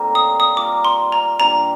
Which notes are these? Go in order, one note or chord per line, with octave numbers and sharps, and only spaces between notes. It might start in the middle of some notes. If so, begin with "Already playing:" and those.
Already playing: A2 G3 A#3 C4 D#4
D#6
D#6
G3 A#3 F4 A#4 D6
C6
A#5
A#2 G3 A#3 D4 A#5